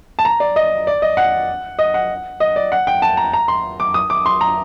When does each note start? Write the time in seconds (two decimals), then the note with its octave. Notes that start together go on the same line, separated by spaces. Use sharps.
0.19 A5
0.25 A#5
0.40 D5
0.56 D#5
0.87 D5
1.02 D#5
1.17 F#5
1.79 D#5
1.94 F#5
2.40 D#5
2.56 D5
2.72 F#5
2.87 G5
3.02 A5
3.17 A#5
3.33 A#5
3.48 C6
3.80 D6
3.94 D#6
4.10 D6
4.26 C6
4.41 A#5